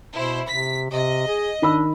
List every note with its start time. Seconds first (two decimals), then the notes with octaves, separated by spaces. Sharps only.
0.13 B2 E4 C5
0.47 C3 B6
0.90 C3 D#5
1.28 G#4
1.62 D#3 D4 B5 E6